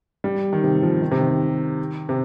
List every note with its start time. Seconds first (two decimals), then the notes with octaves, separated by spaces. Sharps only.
0.24 G3
0.53 D#3
0.63 C3
0.82 F3
1.02 D#3
1.11 C3
1.21 D#3
2.09 C3